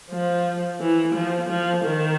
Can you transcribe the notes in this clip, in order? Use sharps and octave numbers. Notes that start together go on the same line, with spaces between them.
F3
E3
F3
F3
D#3